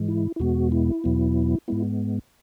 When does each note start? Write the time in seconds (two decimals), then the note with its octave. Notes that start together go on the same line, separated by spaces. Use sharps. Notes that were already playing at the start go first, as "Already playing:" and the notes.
Already playing: G#2 E3 G#3
0.08 E4
0.36 E4
0.40 E2 B2 G#3 B3 F#4
0.72 E4
1.04 E2 B2 F#3 B3
1.68 G#2 G#3 B3 E4